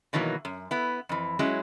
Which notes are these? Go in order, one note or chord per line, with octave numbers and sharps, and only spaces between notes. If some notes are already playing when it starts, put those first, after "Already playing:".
B2 D#3 E3 F#3 A#3
F#2
B3 E4
F2 E3
F#3 G#3 C#4 E4